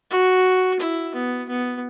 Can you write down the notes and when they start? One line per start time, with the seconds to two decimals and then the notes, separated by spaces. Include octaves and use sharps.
0.10 F#4
0.79 E4
1.14 B3
1.48 B3